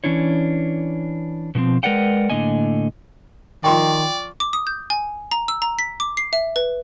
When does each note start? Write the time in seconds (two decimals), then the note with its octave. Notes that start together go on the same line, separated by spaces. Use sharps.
0.04 E3 F3 C#4 D4 E4 C#5
1.55 B2 D3 F3 C4
1.83 G#3 A#4 B4 D5 F#5 G5
2.30 A2 D3 A#3 D#5 G#5
3.64 D#3 F3 D5 G5 C6 C#6
4.40 D6
4.53 D#6
4.67 G6
4.90 G#5
5.31 A#5
5.48 E6
5.62 A#5
5.79 B6
6.00 D6
6.17 C7
6.33 E5
6.56 B4